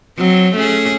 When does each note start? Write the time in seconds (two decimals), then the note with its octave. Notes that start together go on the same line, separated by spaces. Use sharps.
0.18 F#3 C4
0.56 A3 C#4 G#4